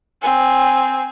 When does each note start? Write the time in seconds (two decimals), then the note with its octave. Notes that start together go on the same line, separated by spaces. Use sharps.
0.22 C4 G#5